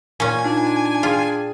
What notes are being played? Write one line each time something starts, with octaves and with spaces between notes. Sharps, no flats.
A#2 C#4 G#5
D4 D#4 F4
F4 G#4 G5 G#6